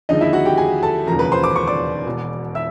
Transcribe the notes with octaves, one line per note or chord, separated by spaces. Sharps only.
D#2 D3 F3 G#3 D#4 D#5
E4 E5
F#4 F#5
G4 G5
G#4 G#5
A4 A5
E1 D#2 C#3 F3 A#4 A#5
B4 B5
C5 C6
D6
C#6
D5 D6
E1 E2 B2
E5 E6